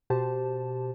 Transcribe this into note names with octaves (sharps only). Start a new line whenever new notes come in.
B2 G4 C5 A5